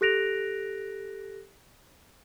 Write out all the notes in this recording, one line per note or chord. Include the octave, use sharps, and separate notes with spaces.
G4 A4 F#6 A#6 D7 F7